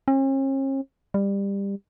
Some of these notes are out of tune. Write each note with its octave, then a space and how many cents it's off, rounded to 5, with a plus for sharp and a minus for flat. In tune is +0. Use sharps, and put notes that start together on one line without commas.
C#4 -45
G3 +20